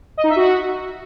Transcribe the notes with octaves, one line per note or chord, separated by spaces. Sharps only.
D#5
D#4
E5
F#4